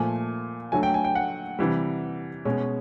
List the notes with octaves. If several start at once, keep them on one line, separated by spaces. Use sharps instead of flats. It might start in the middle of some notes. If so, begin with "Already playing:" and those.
Already playing: A#2 F3 A3 G#5
D3 F#3 A3 G#5
G5
G#5
G5
F#5
C3 E3 G3
B2 G#3 C#4